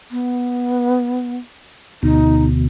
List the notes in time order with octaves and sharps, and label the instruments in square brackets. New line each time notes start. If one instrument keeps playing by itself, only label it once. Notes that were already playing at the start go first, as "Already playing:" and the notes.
[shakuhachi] B3
[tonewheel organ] D2 B2 [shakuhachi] D#4